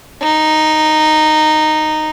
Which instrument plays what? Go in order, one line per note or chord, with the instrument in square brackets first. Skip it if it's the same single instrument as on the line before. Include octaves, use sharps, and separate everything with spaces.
[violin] D#4